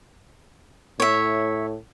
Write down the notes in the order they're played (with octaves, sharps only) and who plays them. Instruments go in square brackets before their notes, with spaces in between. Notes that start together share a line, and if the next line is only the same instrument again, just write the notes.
[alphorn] A2 [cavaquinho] C#5 E5